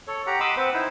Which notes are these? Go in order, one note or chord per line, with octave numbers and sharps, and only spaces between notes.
A4 C#5
G4 F#5 A#5
D#5 B5 C6 D6 E6
C4 B4 C5 F#5
D#4 E4 C5